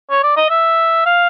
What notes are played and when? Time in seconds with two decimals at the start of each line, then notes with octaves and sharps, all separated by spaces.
0.10 C#5
0.23 D5
0.37 D#5
0.50 E5
1.06 F5